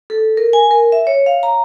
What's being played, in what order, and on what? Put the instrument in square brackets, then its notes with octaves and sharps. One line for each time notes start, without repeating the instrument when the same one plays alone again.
[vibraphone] A4
A#4
G#5
A#4
E5
C#5
F5
A#5